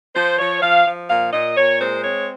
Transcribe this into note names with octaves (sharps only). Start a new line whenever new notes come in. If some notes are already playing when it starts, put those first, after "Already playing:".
F3 C5
F3 C#5
F3 F5
F3
A#2 F5
A#2 D#5
A#2 C#5
G#3 C5
C4 C#5